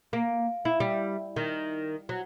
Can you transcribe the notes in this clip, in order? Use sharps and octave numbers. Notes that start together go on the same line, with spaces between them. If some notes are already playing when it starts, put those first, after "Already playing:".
A#3
E4
G3
D#3
F#3